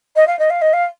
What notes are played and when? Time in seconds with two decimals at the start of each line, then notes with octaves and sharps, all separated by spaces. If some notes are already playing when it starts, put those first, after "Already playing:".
0.16 D#5
0.27 F5
0.39 D#5
0.50 F5
0.61 D#5
0.73 F5